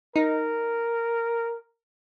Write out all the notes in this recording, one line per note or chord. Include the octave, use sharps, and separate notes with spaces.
D#4 A#4